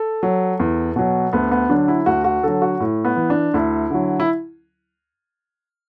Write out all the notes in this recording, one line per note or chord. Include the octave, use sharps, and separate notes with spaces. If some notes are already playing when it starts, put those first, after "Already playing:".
Already playing: A4
F#3
E2
B2 F#3
D2 B3
B3
D3 F#3 D4
E4
D2 F#4
F#4
D3 F#3 A4
F#4
A2
B3
E3
D4
D2 E4
D3 F#3
E4